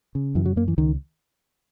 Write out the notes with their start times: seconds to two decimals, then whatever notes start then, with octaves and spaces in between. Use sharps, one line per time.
0.15 C#3
0.35 F#2 E3
0.46 F#3
0.56 F#2 A#3
0.68 E3
0.78 C#2 D#3